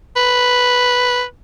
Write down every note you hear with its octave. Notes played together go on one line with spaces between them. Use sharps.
B4